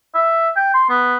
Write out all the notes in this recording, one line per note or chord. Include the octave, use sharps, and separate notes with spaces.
E5
G5
C6
B3